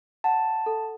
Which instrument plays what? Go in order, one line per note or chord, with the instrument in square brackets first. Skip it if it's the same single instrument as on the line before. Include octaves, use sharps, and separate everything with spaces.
[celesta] F#5 [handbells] A5
[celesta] A4